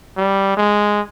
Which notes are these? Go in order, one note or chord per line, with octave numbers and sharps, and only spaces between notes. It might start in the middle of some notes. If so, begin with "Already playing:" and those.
G3
G#3